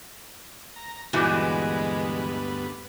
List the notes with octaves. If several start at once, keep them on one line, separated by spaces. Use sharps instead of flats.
A#5
D2 G2 A#2 E3 G#3 B3 F#4